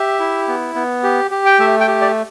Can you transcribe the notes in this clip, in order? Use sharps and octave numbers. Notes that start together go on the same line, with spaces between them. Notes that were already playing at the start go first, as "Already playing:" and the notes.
Already playing: G4 E5
E4
B3
B3
G4
G4
G5
A3 E5
G5
G4
D5